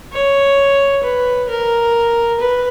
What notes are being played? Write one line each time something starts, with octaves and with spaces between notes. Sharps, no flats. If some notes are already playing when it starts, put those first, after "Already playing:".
C#5
B4
A#4
B4